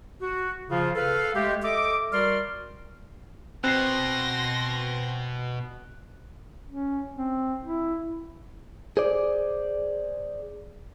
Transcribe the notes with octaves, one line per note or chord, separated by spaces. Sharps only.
F#4
C#3 F3 F4
A4 B4 F5
G#3 A3 G4
A4 D#5 E5 D6
G3 F#4 A#4 D5 C6 F6
B2 C4 C6 F#6 A#6 C7
C#4
C4
E4
G#4 C5 D5